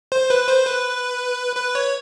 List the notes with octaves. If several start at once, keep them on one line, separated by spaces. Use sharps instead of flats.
C5
B4
C5
B4
B4
C#5